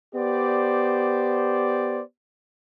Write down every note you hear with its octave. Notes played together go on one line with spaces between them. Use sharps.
B3 G4 C5 D5